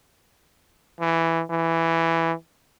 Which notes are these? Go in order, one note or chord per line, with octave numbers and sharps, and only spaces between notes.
E3
E3